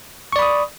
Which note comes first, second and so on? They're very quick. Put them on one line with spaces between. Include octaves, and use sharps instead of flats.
C#6 D5 B5 D#6